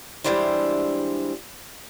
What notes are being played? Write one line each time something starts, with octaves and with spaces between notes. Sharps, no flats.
E3 G3 G#3 D4 E4 C5